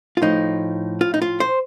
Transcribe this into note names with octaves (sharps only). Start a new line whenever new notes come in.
F4
A2 F3 D#4
F4
D#4
F4
C5